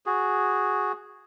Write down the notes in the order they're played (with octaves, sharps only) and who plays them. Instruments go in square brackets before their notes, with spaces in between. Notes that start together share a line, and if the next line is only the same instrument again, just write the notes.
[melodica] F#4 G#4